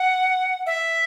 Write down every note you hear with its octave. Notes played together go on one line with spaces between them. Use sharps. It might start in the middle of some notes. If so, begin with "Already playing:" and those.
Already playing: F#5
E5